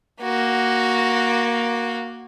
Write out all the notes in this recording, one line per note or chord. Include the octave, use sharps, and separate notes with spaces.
A#3 F#4